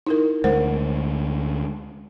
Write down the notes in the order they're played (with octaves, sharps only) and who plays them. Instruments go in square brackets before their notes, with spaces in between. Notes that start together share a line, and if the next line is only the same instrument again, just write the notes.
[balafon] D#4 E4 A#4
[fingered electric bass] D2 G#3 [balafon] A#4 C5 F#5